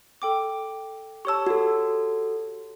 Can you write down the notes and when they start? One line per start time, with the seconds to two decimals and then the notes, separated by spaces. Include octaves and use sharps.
0.22 A4 G5 D6
1.25 G4 C#5 A5 C#6 E6
1.47 F#4 A4